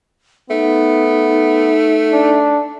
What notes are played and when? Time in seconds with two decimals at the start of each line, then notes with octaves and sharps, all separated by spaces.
0.50 A3 B3 D#4
2.13 D4